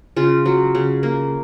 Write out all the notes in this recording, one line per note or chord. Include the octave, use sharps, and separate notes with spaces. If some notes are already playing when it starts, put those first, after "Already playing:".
C#3 F4
F#3
C#3
A#3